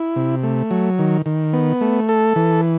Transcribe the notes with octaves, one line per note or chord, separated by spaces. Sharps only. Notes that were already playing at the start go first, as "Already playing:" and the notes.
Already playing: E4
C3
A3
F#3
D#3
D#3
B3
A3
A4
E3